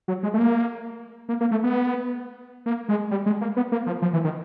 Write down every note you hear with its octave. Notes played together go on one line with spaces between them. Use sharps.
F#3
G#3
A3
A#3
A#3
A#3
A3
B3
A#3
G#3
G3
G#3
A#3
B3
A#3
F3
F3
E3
D#3